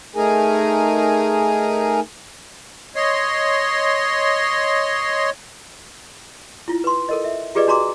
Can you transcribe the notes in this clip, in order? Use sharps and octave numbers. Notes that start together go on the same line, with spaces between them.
A3 D#4 G#4 A#4 G#5 A#5
C#5 D#5 C6
E4 F4
B4 C6
A4 A#4 D#5
E5
F4 G4 G#4 B4 D5 D#5
D4 F#4 A#5 C6 D6